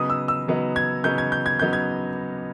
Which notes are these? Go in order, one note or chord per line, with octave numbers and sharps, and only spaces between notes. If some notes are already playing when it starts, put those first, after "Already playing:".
Already playing: C#3 F#3 B3 D#4 D#6
E6
E6
C#3 F#3 B3 D#4
G#6
C#3 F#3 B3 D#4 G6
G#6
G6
G#6
C#3 F#3 B3 D#4 G6
G#6